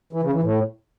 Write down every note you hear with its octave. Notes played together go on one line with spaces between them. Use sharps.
E3
C#3
E3
A2